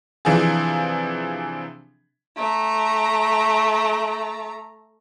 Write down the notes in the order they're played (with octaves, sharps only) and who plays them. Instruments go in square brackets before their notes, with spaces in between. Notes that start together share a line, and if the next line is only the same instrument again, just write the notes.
[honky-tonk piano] C3 E3 F3 D4 G#4
[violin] A3 A#5